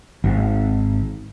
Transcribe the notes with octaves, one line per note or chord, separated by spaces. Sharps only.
G#1